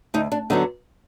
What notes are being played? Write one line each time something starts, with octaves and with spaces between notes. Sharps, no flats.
D2 D#4
D4
D3 F#3 B3 D#4